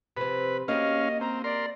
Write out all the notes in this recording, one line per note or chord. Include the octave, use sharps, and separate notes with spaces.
C3 F3 C4 B4
A#3 C#4 F#4 G4 D#5 F5
C4 A#5
A#4 D5 C6